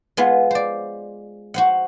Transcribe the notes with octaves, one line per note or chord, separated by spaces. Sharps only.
G#3 B3 F4
C5 D5
F#4 C5 F#5